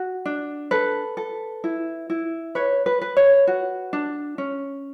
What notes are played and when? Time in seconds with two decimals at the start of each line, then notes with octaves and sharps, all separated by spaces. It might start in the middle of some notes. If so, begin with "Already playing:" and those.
Already playing: F#4
0.26 D4
0.71 A4 B4
1.17 A4
1.64 E4
2.10 E4
2.55 B4 C#5
2.86 B4
3.02 B4
3.17 C#5
3.47 F#4
3.93 D4
4.38 C#4